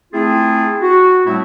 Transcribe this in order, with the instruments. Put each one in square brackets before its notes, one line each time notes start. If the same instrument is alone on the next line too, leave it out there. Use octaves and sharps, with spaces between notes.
[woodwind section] A3 C4 E4 F4 G#4
F#4
A2 G3 A3 B3 C4 E4